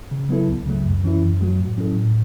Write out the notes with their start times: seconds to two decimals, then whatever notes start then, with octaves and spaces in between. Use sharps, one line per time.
0.11 C#3
0.29 F#3 B3 E4 A4
0.48 C#2
0.66 C#3 F#3 A3
0.84 F#2
1.04 E3 C#4 E4
1.22 F#2
1.41 F#3 A3 F#4
1.59 A2
1.77 F#3 C#4 E4 A4
1.97 A2